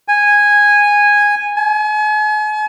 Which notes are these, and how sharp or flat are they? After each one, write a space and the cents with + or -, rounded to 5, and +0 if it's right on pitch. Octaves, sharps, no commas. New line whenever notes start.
G#5 -10
G#5 +40